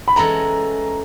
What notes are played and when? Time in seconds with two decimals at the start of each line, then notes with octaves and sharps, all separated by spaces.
0.08 B5
0.16 E3 G#3 C#4 F#4 A4 A#5